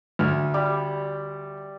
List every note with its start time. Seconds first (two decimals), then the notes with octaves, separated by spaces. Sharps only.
0.19 D2 F6
0.54 G3